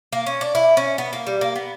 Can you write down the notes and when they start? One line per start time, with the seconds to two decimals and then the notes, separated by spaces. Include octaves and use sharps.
0.13 A#3
0.26 C#4
0.41 D4
0.55 E4
0.77 C#4
0.98 B3
1.13 A#3
1.27 G3
1.41 A#3
1.55 B3